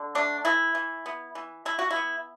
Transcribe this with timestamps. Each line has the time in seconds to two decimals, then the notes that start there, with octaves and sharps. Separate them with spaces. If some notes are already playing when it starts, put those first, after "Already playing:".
Already playing: D3
0.15 A3 D4
0.45 E3 E4
0.75 E3
1.06 B3
1.35 E3
1.65 E3 E4
1.79 F#4
1.91 E4
1.96 B3